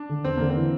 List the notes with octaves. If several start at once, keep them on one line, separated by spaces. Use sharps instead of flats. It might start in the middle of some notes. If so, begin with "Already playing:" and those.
Already playing: D4
D3
E2 C4
D3 A#3
C4
E3